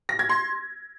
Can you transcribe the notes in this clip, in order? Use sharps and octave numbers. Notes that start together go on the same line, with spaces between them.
A#6
G#6
C6